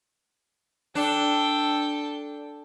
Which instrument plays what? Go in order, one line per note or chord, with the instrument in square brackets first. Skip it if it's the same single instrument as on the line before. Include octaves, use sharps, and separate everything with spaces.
[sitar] D4 [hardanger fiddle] A4 G5